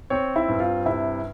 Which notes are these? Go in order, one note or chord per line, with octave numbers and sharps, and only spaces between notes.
C4 C#5
E4
G2
F4
C3 E4